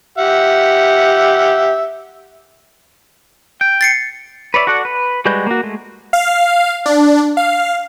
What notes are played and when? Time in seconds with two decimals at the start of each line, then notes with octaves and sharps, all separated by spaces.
0.18 G4 E5 F#5
3.61 G5
3.81 A6 C7 C#7
4.54 B4 C#5 D5 E5
4.67 F#4 A4 D5 F#5
4.85 B4
5.25 G3 G#3 F#4 B4 G6
5.47 A#3 F#4
5.63 G#3 A3
6.13 F5
6.86 D4
7.37 F5